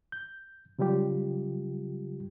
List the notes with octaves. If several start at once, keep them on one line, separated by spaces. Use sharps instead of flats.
G6
C#3 F#3 G3 F4 G4